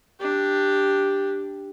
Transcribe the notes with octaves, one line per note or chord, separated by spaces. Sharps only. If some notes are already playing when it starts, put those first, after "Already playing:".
D4 G4